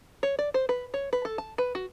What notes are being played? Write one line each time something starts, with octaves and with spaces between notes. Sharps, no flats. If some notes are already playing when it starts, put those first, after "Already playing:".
C#5
D5
C5
B4
C#5
B4
A4
A5
B4
F#4